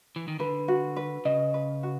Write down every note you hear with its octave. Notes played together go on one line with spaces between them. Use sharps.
E3
D#3
D3 B4
F#4
B4
C#3 D#5
B4
F#4